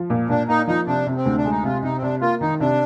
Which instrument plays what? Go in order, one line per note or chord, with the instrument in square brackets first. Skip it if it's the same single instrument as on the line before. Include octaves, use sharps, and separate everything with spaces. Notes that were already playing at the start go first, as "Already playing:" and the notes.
Already playing: [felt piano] F3
A#2
[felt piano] A#2 [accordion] D4
[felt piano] A#3 [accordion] D#4
[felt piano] F3 [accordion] D#4
[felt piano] C3 [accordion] D4
[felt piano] C3
[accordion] C4
[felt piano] D2
[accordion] D4
[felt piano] G#3
[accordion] D#4
[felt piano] C3 [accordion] F4
[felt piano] C3 [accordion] D#4
[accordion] C4
[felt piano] C3 [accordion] D4
[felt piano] A#3 [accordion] F4
[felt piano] D#3 [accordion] D#4
[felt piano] C3 [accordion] D4